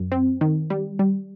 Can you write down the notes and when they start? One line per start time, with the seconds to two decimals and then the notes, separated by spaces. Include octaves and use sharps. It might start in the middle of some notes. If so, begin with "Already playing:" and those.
Already playing: F#2
0.12 C4
0.41 D#3
0.70 G3
0.99 G3